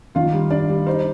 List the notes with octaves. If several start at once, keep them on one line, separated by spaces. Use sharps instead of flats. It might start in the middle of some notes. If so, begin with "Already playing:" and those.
D#3 F4 F5
G3
D4 D5
G3
D#4 C5